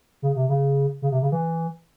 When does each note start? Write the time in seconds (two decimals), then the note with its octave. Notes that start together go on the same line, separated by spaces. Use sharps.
0.22 C#3
0.36 C3
0.49 C#3
1.02 C#3
1.12 C3
1.22 C#3
1.32 E3